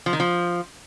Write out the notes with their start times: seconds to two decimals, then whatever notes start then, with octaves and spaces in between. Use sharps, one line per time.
0.06 F3
0.13 D#3
0.20 F3